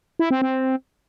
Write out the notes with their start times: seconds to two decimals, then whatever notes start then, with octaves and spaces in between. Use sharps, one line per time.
0.19 E4
0.31 C4
0.42 C4